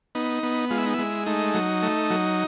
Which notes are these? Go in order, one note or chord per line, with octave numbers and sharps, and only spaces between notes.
B3 D#4
B3
G#3 F4
E4
D#4
G#3 E4
A3 D#4
F#3
A3
F#3